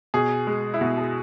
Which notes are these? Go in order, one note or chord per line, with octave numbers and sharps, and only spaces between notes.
B2 G#4
G#3
E4
B2 F#4
G#4